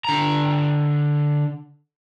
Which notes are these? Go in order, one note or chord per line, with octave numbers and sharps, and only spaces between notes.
D3 A#5